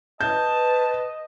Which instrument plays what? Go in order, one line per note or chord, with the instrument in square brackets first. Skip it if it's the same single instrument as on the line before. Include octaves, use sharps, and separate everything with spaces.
[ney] B4 [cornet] D#5 [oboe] A5 [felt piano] G6